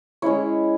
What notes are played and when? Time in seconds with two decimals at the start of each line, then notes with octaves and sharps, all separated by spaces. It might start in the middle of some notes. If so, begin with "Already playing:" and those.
0.22 G#3 C#4 E4 C#5